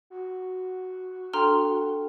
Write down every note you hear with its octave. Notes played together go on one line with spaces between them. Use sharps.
F#4
D4 A4 G5 A#5 C6 F6